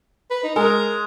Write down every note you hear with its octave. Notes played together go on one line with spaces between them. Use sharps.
B4
D#4
G#3 A#4